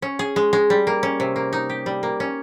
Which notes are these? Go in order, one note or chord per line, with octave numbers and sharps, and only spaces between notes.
C#4
G#4
G#3
G#3
G3
A#3
C#4
C3
A#3
D#4
G4
G3
A#3
C#4